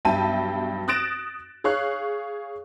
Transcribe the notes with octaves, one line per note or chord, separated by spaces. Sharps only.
B1 G2 E5 G5 A5 D#7
D#6 F#6 A6 A#6 D7 E7
G#4 C#5 F5 C#6 F#6